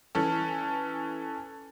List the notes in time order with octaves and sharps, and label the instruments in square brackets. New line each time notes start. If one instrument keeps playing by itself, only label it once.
[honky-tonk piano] E3 C#4 A4